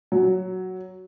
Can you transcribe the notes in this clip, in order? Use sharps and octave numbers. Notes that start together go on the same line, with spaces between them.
F#3